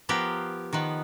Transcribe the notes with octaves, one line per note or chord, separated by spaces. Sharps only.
F3 B3 F4 G4 A#4
D#3 F3 B3